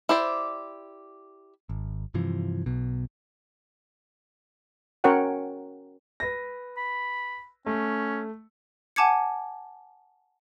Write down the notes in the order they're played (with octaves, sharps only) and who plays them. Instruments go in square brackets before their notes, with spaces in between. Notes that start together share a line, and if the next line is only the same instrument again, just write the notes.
[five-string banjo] E4 G4 C5 D5
[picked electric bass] G#1
G2 C3 E3 F3
B1 B2
[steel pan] C#4 F#4 A#4 C#5 F#5 G5
[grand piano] B4 A#6
[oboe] B5
[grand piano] A3 [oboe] C#4
[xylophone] F#5 G#5 A5 D6 G#6 C#7